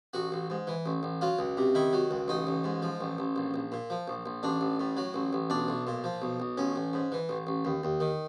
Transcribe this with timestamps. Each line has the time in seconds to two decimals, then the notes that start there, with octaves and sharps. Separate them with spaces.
0.14 A1 F#4
0.32 A1
0.50 G#2
0.67 E3
0.86 A1
1.03 A1
1.21 F#3 F4
1.39 C#2
1.57 C3
1.75 D#3 E4
1.93 F#3
2.11 C#2
2.28 A1 D#4
2.47 A1
2.64 G#2
2.82 F3
3.01 A1
3.18 A1
3.36 A#1
3.54 A#1
3.72 A#2
3.90 F3
4.08 A#1
4.26 A#1
4.43 A1 D4
4.61 A1
4.80 A2
4.97 F#3
5.14 A1
5.33 A1
5.50 B1 D4
5.68 B1
5.87 A#2
6.04 F3
6.22 B1
6.40 B1
6.58 A1 C#4
6.76 A1
6.93 G#2
7.12 E3
7.29 A1
7.47 A1
7.65 D#2
7.83 D#2
8.00 D#3